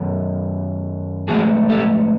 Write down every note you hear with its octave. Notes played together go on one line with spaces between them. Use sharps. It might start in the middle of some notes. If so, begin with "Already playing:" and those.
Already playing: F#2 D#3
G#2 F3 A3 F#4 G#4
G4 A4